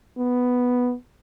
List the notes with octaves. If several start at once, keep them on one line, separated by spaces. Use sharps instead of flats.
B3